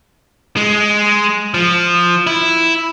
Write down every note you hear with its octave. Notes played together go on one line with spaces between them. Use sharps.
G#3
F3
E4